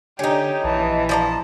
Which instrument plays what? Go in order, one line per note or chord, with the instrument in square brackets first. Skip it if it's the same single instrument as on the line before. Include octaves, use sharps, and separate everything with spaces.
[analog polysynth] D3 [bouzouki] C#4 D#4 [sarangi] G4
[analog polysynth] A#1 D#5 [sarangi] E3 [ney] A5
[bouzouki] F3 D5 A#5 [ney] A5